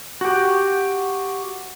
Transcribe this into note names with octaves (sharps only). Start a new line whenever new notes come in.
F#4 G4